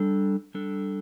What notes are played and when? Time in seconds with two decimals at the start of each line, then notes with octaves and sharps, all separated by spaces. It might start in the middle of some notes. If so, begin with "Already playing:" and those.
Already playing: G3 D4 A4
0.54 G3 D4 A4